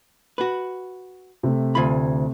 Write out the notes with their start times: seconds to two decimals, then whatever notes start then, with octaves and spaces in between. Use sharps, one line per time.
0.38 F#4 B4
1.43 C3 A3
1.75 D2 F4 B5